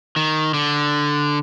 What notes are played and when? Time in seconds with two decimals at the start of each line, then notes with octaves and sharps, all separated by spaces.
0.16 D#3
0.54 D3